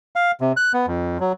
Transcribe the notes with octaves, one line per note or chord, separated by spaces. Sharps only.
F5
C3
F#6
B3
F2
F#3